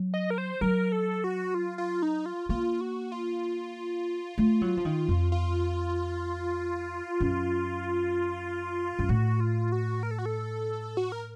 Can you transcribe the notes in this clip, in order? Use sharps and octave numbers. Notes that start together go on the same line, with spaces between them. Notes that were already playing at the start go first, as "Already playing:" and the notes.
Already playing: F#3
D#5
A#4
C5
F#3 A#4
A4
F#4
F4
F4
D#4
F4
A#3 F4
F#4
F4
A3
F#3
F3
D#3
F2
F4
F#2
F#2
A2 F#4
F4
F#4
A#4
A4
F#4
A4
F#4
A#4